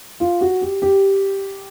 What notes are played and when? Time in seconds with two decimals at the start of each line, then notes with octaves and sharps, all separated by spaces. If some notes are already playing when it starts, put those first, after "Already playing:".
0.20 F4
0.41 F#4
0.62 G4
0.82 G4